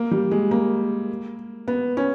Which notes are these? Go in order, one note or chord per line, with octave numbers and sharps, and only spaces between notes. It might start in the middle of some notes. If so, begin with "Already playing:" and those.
Already playing: A#3
G3
G#3
A#3
B3
C#4